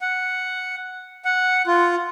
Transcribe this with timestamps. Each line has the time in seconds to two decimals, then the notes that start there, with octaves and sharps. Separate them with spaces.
0.01 F#5
1.25 F#5
1.67 F4